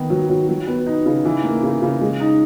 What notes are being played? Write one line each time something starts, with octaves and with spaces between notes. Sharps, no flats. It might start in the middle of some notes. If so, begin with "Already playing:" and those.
Already playing: D#3 B3 D#4
F#3
F#3
F#3
B3
D#4
C#3
E3
A#3
C#3
C#3
G#3
D#4